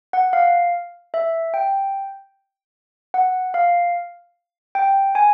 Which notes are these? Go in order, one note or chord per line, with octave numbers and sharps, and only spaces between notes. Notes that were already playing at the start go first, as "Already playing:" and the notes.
F#5
F5
E5
G5
F#5
F5
G5
G#5